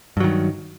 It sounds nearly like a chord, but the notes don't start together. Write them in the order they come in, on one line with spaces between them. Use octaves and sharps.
G2 F#3 D#3